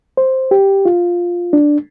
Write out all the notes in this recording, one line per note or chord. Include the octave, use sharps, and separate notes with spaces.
C5
G4
F4
D4